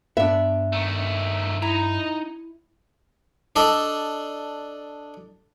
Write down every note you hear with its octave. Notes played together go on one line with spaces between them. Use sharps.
G2 B3 D4 E5
D#3 A3
D#4 E4 A#5
D4 A4 D5 D#5